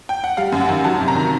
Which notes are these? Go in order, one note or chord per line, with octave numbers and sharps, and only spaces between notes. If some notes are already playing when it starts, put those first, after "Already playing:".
G5
F#5
G3 F5
F#2
F#5
D#3
F#3 A5
C3
A#5
D#3